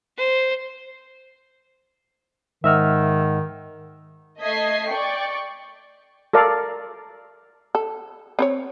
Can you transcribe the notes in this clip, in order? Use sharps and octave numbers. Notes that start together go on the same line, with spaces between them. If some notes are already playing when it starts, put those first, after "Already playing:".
C5
G#2 D#3 D#5 E5 F#5 E6 F6
A3 D#5 G#6 B6 C7
D5 G5 C#6
A4 A#4 D5 F5
A4
C4 C5 C#5